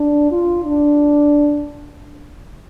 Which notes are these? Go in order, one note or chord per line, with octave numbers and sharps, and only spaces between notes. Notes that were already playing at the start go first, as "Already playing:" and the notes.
Already playing: D4
F4
D4